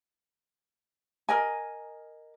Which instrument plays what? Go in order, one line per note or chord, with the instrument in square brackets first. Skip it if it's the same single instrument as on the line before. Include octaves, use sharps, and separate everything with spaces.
[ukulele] A#4 D#5 G#5